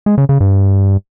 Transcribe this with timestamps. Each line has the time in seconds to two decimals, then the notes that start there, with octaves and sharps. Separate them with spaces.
0.06 G#3
0.18 C#3
0.29 C#3
0.40 G2